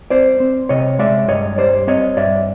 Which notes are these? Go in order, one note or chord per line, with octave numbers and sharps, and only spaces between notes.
C4 C5 D5
C4
C3 C#5 D#5
G#3 D5 E5
G2 C#5 D#5
G3 C5 D5
C4 C#5 D#5
G2 D5 E5